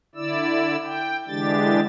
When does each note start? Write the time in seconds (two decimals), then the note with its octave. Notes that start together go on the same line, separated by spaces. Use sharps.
0.15 D3 E4 D5 E6
0.85 G5
1.28 D3 E3 G#3 D4 G4 A6